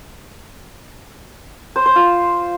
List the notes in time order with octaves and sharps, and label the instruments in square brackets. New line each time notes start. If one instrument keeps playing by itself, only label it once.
[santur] C5
C5
F4